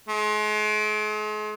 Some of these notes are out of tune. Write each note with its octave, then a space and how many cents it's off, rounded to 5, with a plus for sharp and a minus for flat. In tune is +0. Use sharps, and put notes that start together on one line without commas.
G#3 +40